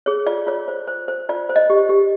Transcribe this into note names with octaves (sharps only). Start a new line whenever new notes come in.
G#4 C#5
F4 D5
F4 C#5
C5
C5
C5
F4 D5
C5
D#5
G4
G4